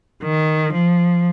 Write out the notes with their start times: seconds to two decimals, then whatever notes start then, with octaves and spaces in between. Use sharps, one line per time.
0.24 D#3
0.74 F3